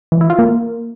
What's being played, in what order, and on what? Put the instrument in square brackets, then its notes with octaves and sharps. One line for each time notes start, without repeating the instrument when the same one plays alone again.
[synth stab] E3
E4
F4
A#3